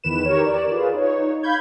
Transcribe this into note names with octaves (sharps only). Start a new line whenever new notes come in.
E2 D#3 B4 E7
G4 A#4 C#5
D5
F4 G#4 B4
D#4 C#5
F5 B5 G6 G#6